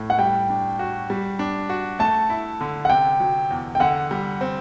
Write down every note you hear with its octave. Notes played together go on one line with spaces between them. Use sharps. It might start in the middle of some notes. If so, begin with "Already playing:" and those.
Already playing: A2
F#5
G3 G5
D4
F#4
G3
D4
F#4
A3 A5
E4
D3
F#5
C3 G5
F#3
E2
G5
D3 F#5
G3
C4